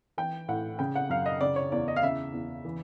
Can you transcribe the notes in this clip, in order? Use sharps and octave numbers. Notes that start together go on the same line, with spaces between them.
E3 G5
A2 F#5
C#3 G5
F#5
F#2 F5
D#5
C#3 D5
C#5
E2 D5
D#5
F5
C#3 E5
E2
E3